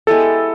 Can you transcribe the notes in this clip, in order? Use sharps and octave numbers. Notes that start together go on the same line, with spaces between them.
G#3 B3 E4 G4 A4